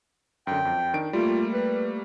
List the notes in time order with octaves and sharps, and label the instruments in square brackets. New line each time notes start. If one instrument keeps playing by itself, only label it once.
[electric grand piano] F#2 D3 [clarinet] G5
[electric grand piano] F2
D#3 D4 D7
[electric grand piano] G3 A3 A#3 [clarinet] F4
[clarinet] B4